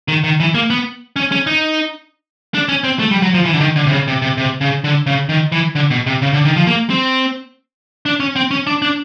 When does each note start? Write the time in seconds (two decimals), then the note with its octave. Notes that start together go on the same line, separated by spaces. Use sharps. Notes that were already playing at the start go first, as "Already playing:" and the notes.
0.08 D#3
0.24 D#3
0.40 E3
0.55 A#3
0.70 B3
1.16 C#4
1.32 C#4
1.47 D#4
2.54 D4
2.69 C#4
2.84 C4
2.99 A3
3.11 G3
3.22 F#3
3.34 F3
3.45 E3
3.54 D3
3.60 D#3
3.76 D3
3.87 C3
3.92 C#3
4.08 C3
4.22 C3
4.37 C3
4.61 C#3
4.84 D3
5.06 C#3
5.29 D#3
5.52 E3
5.75 D3
5.91 B2
6.07 C3
6.22 C#3
6.33 D3
6.45 D#3
6.56 F3
6.67 A#3
6.90 C4
8.06 D4
8.20 C#4
8.36 C4
8.51 C#4
8.67 D4
8.82 D4